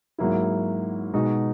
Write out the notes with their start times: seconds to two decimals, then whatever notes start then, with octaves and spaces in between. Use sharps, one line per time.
0.18 G#2 F#3 A#3 E4
1.13 B2 G#3 D#4 F#4